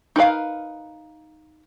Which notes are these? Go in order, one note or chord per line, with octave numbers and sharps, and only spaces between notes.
D#4 A#4 B4 F5